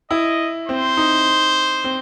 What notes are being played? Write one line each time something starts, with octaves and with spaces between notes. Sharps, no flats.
E4 D#5
C4 C5
D#4
C4